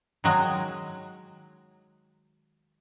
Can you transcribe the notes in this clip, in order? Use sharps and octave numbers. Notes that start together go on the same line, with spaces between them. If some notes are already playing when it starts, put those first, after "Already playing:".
D#3 F#3 G#3